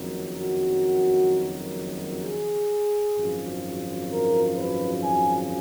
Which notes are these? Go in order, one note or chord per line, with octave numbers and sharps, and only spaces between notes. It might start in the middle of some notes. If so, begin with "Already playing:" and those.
Already playing: F#1 F2 D#3 F#3
F#4
G#4
G#1 F#2 F3
A#4
B4
G#5